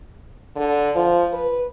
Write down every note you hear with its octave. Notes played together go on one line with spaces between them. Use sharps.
D3
F3
B4